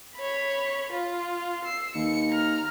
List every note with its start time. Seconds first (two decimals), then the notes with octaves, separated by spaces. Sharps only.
0.16 C#5 B5
0.92 F4
1.65 E6 C7
1.95 D#2 C#7
2.31 A#5 F6